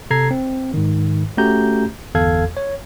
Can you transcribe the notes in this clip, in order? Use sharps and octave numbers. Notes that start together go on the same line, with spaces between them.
C3 A4 A#5 G#6 C7
C4
G#2 D#3
A3 C#4 F#4 G4 A#5 G6
G1 E2 A4 F5 G#6
C#5